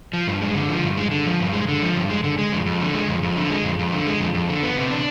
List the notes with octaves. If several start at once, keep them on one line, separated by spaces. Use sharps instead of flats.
F3
G2
G#3
D3
F3
G2
G#3
D3
F3
G2
G#3
D3
F3
G2
G#3
D3
G#3
F2
F2
D3
G#3
F2
F2
D3
G#3
F2
F2
D3
G#3
F2
F2
D3
B3
C3
D4